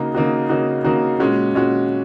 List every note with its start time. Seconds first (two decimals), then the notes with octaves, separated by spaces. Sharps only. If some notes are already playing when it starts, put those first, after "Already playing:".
Already playing: C#3 A#3 D#4 F#4
0.15 C#3 A#3 D#4 F#4
0.49 C#3 A#3 D#4 F#4
0.84 C#3 A#3 D#4 F#4
1.20 A#2 G#3 C#4 F#4
1.55 A#2 G#3 C#4 F#4